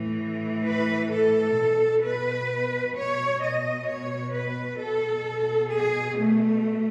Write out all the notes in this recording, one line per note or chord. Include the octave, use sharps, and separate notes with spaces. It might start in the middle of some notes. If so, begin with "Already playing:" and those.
Already playing: A2 E3
B4
A4
B2
B4
C#5
B2 D#5
C#5
B4
A4
B2
G#4
A3